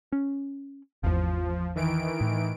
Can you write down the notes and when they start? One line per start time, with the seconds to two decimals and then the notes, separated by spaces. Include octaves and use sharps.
0.12 C#4
1.03 G#1 E2 F3
1.75 D#3 E3 D7
2.21 A2